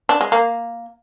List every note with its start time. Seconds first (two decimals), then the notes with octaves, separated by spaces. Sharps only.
0.09 D4
0.21 G#3
0.32 A#3